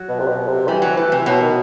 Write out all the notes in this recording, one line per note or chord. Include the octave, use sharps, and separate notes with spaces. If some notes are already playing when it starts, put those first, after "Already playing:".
Already playing: F#3
B2
C3
B2
C3
E3 G3
F#3
E3 A3
C3
E3
B2 F#3
D#3